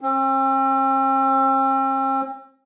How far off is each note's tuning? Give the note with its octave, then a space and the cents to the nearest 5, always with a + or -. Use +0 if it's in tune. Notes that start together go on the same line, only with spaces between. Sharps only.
C4 +45